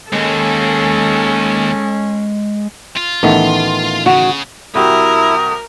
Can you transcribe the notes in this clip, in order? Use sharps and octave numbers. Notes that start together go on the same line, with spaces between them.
D#2 G#3 C#4 G#4 A4
F4
A1 D#3 A3 B3
C#3 F#4
C2 E4 F#4 G4 A#4 D#6